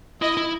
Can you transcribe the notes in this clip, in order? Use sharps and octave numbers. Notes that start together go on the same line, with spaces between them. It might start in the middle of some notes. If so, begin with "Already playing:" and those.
E4 D#5
E4